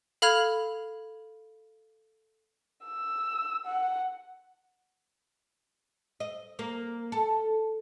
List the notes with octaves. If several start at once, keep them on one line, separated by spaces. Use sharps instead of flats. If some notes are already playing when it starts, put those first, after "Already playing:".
A4 F5 B5 F6 G#6 F7
E6
F#5
D#5
A#3
A4